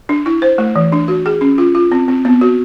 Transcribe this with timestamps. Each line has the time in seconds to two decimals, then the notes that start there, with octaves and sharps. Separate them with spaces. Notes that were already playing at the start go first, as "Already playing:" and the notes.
0.09 D4
0.26 E4
0.42 C5
0.58 A3
0.76 E3
0.92 D4
1.08 F#4
1.26 G#4
1.41 C#4
1.58 F4
1.75 F4
1.92 C4
2.08 C4
2.25 B3
2.41 F#4